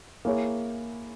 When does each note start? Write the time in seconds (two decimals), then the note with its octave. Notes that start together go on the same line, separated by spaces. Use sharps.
0.25 A#3 E4 G#4 C#5